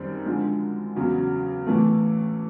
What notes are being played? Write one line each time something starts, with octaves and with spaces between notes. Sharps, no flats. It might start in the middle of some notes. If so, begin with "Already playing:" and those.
Already playing: F#2 D#3 G3 C4
D3 F3 G#3
E2 C#3 F#3
A2 E3 A3